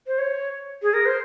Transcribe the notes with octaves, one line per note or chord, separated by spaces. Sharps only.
C5
C#5
G#4
A#4
C5